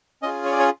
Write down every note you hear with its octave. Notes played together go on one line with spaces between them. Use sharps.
C#4 F4 G#4 D#5
C#5
D5
C#5